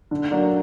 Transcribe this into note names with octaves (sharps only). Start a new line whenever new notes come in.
D3
F#3 A#3 D4